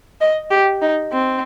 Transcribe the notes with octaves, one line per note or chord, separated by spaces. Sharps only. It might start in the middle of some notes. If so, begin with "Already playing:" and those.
D#5
G4
D#4
C4